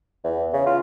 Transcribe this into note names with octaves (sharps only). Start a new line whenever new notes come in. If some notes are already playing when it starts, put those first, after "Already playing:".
E2
C#3
F4